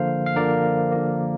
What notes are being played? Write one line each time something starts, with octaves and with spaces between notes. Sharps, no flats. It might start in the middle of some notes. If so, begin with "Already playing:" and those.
Already playing: D3 F3 A#3 C5 F5
F5
D3 F3 A#3 A#4 D5
D3 F3 A#3